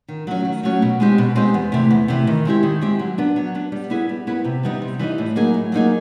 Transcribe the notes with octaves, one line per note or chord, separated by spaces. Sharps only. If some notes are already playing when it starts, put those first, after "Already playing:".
D#3
F#3 A3 C#4 F#4
D#3
F#3 A3 C#4 F#4
B2
G#3 C4 D#4 G4
B2
G#3 C4 D#4 G4
E2
C3 E3 A3
E2
C3 E3 A3
D#3
G#3 C4 E4 G4
D#3
G#3 C4 E4 G4
F#3
B3 D4
F#3
B3 D4
G3
B3 E4 G#4 B4
G3
B3 E4 G#4 B4
C3
E3 G3 B3 D#4
C3
E3 G3 B3 D#4
A2
F#3 A#3 D#4 G#4
A2
F#3 A#3 D#4 G#4